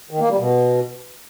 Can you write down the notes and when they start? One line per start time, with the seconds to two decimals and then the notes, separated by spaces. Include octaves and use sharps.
0.11 D#3
0.20 A#3
0.29 G3
0.39 B2